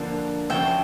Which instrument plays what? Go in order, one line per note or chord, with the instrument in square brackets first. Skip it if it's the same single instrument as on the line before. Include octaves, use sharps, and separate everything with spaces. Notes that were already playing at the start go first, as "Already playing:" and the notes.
Already playing: [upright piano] D3 F3 A#3 D4
[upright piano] D2 D3 F3 C#4 [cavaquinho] E5 G5